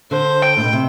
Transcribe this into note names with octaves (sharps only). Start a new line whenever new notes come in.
D3 C5
G5
A2
B2
C3